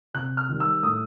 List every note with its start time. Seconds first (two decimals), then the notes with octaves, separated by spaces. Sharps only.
0.14 C3 F#6
0.37 F6
0.49 D#3 G3
0.60 E6
0.83 A2 D#6